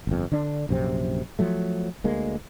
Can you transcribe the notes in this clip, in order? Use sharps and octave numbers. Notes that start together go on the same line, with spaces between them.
G1 F2
D3 D4
A#1 F#2 C3 C4
F3 F#3 A3
D2 G#3 A#3